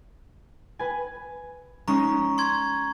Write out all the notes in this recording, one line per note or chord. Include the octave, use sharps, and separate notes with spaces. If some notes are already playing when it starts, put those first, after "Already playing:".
B4 G#5
G#3 C#4 D#4 A#5 C#6
C6 G#6